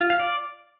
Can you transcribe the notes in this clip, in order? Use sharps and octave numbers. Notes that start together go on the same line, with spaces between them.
F4
F5
D5